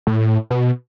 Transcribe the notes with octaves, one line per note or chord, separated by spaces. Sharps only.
A2
B2